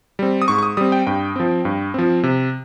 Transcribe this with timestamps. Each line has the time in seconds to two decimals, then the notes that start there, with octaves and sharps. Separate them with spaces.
0.19 G3 C4
0.42 D#6
0.48 G#2 C#6
0.58 C#6
0.63 D#6
0.77 G3 C4 D#6
0.92 G5
1.07 G2 G5
1.36 F3 C4
1.65 G2
1.94 F3 C4
2.23 C3